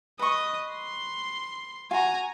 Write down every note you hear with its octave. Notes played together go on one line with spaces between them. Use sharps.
B4 D#5 C#6
C6
F4 F#4 G#5 A#5